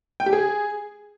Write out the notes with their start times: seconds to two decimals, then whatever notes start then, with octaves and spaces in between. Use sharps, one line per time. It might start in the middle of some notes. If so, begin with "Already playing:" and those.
0.20 G5
0.26 G4
0.33 G#4